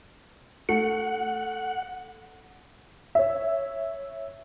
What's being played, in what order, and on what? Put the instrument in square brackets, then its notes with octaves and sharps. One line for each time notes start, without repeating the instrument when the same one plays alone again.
[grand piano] A3 [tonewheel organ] F#5
[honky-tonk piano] C#5 E5